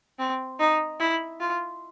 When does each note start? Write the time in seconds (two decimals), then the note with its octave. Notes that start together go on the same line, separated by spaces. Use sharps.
0.19 C4
0.60 D#4
1.00 E4
1.40 F4